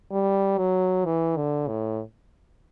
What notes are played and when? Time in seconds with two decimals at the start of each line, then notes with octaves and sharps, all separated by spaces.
0.11 G3
0.58 F#3
1.05 E3
1.37 D3
1.68 A2